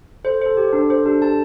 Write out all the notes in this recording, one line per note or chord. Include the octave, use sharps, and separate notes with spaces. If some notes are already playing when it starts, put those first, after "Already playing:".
A4 C5
A4 C5
G4
D4 C5
A4 C5
D4 G4
G4 A5